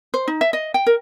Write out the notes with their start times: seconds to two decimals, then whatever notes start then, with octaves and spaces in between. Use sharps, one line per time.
0.14 C5
0.28 D#4
0.41 E5
0.53 D#5
0.74 G5
0.87 A#4